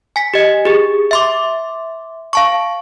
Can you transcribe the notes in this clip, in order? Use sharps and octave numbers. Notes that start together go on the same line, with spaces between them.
G#5 B6
G4 D#5
G4 G#4
E5 C6 D6
F5 A5 C#6